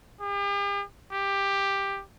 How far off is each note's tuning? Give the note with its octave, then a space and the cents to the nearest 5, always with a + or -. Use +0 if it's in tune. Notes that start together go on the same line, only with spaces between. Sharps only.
G4 +45
G4 +10